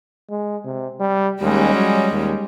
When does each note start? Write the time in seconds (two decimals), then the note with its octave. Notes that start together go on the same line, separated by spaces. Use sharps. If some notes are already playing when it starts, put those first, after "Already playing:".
0.30 G#3
0.65 C3
1.00 G3
1.41 D#2 G3 G#3 C#4
1.74 F#3
2.12 D#2